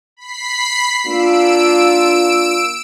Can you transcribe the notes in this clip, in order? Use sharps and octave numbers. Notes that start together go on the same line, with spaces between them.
B5 B6 C7
A#3 D4 F4 E6 D7